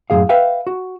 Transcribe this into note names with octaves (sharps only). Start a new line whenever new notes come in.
F#2 A2 E3 G#4 F5
B4 E5 F5 G5
F#4